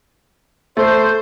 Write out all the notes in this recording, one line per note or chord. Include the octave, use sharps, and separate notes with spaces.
A3 C5